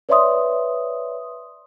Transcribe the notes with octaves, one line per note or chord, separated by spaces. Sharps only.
B4 C#5 D5 E5 C6 D#6